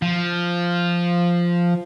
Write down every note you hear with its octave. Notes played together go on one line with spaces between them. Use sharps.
F3